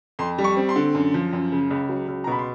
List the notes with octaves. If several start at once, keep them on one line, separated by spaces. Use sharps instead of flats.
F2 C6
G3
C#6
C4
C6
D3
F#2
F3
F#2
C#3
C#2
F#3
C#2
A#5
B2 B5
C6